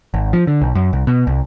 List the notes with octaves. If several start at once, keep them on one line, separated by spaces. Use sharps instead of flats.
G#1
F3
D3
B1
F#2
C2
B2
C2